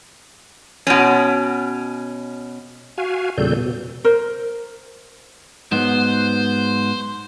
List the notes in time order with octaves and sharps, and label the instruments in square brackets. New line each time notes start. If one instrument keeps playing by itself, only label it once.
[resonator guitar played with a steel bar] B2 C#4
[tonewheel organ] F#4 F5 G#5
E2 A#2 C#3 G3 A4 G6
B2
[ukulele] A#4 C5
[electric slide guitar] G#2 F#3 B3 [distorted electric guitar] C5